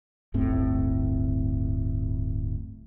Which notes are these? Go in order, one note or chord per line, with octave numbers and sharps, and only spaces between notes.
D1 G1 A2 C4